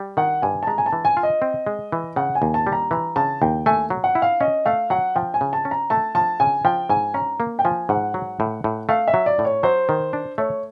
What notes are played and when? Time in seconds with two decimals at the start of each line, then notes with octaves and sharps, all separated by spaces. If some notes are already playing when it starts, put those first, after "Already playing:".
Already playing: G3
0.17 D#3 F#5
0.42 G2 G#5
0.63 A5
0.67 G#3 A#5
0.78 G#5
0.86 A5
0.93 E3
1.05 G#5
1.17 F4
1.23 D#5
1.42 C4
1.66 G#3
1.92 E3
2.16 C#3 F#5
2.35 G#5
2.42 D#2
2.54 A5
2.67 G3
2.72 A#5
2.91 E3 A#5
3.16 C#3 A5
3.42 D#2 G5
3.66 A3 G#5
3.90 F#3
4.04 F#5
4.15 E4
4.22 F5
4.41 C#4 D#5
4.66 A3 F5
4.90 F#3 F#5
5.15 F3 G5
5.34 G#5
5.41 C#3
5.53 A5
5.65 C#4
5.71 A#5
5.90 A3 A5
6.15 F3 A5
6.40 C#3 G#5
6.65 F3 G5
6.89 G#2 G#5
7.14 C#4 A#5
7.40 A#3
7.59 G5
7.64 F3 G#5
7.89 G#2 F#5
8.14 F#3
8.40 A2
8.64 A2
8.89 A3 F5
9.08 E5
9.14 F#3
9.26 D5
9.39 A2
9.45 C#5
9.63 F#3 C5
9.89 D#3
10.13 D4
10.38 A3 C#5